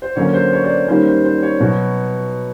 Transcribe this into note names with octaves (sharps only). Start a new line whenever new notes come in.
C5
D3 F#3 A#3 C#4 C#5
C5
C#5
C5 D5
D#3 G3 A#3 C#4 C5
C5
C5
C#5
B2 F#3 B3